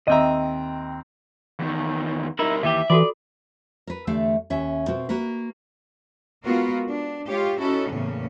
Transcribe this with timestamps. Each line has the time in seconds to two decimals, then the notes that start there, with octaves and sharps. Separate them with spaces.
0.08 D#2 C4 D#5 E5 A#5
1.59 E2 D#3
2.39 G3 D#4 E4 A#4
2.63 D#2 E3 G4 E5
2.90 E3 F4 F#4 A4 D5
3.87 A#4 B4
4.07 E2 D3 A3 G4 E5 F5
4.50 D#2 C#4 E5
4.88 B2 C4 F#4 A#4
5.09 A#3 F#4 A#4 B4
6.43 G#3 B3 F4 F#4 A#4
6.88 D4
7.27 G#3 F4 G4 C#5
7.58 C#4 D#4 E4 F#4 A4
7.90 E2 A2 C#3 A#3 C#4